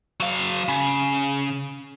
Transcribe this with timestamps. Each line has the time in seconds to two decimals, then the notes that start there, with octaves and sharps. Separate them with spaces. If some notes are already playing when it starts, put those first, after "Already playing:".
0.20 F#3 F5
0.68 C#3